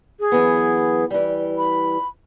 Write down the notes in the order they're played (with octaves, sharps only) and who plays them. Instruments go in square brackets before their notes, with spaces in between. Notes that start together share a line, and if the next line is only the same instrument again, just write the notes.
[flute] G#4
[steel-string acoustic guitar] F#2 E3 B3
E3 G3
[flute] B5